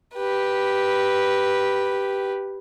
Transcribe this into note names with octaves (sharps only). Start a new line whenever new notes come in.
G4 B4